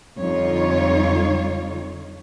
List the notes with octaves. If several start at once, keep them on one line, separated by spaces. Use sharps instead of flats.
F2 D3 G3 D#4 F4 C#5